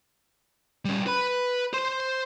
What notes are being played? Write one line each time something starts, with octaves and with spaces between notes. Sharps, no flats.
G3 C#4
B4 B5
C5 C6